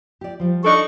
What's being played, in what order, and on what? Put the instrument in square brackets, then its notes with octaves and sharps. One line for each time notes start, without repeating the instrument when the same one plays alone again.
[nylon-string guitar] G4 D5
F3 G3
[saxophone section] D4 D#4 A4 [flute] C#6